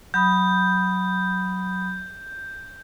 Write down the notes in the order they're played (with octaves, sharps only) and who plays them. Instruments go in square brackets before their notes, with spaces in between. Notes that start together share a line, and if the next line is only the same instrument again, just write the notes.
[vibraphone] F#3 B5 D#6 [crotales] G6